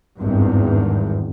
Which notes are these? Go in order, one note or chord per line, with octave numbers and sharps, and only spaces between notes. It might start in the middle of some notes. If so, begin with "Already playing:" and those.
G#1 E2 G2